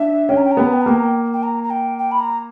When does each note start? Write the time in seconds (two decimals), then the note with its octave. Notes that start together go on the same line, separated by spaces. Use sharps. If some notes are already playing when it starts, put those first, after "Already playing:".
Already playing: D4 E5
0.29 C#4 G5
0.37 A#5
0.45 G5
0.51 A#5
0.57 B3 G5
0.66 A#5
0.73 G5
0.81 A#5
0.86 A#3 G5
0.96 A#5
1.03 G5
1.33 G5
1.43 A#5
1.63 A#5
1.70 G5
1.98 G5
2.11 B5
2.20 A#5